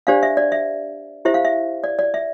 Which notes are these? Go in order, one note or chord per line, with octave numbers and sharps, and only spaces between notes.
D4 G4 C5 D5 F5
E5
D5
E5
E4 G4 C5 E5
F5
E5
D5
D5
E5